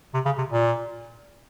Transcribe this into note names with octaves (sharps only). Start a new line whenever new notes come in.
C3
C#3
C3
A#2